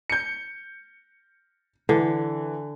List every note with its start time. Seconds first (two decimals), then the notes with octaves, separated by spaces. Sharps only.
0.10 G6 C#7
1.89 D3 E3